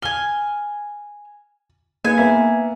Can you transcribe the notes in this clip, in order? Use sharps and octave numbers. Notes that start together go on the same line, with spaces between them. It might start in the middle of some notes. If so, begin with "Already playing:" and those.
G#5 F6 G7
A#3 D#4 G#4 B4 G#5
A#3 B3 E5